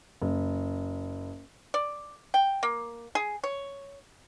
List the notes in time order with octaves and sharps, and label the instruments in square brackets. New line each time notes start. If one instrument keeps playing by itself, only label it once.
[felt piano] F#1
[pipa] D5
G5
A#3
G#4
C#5